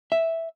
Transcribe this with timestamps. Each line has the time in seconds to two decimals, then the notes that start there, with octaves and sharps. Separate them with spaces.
0.12 E5